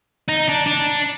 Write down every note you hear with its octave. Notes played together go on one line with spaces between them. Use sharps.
D#4
D4
D4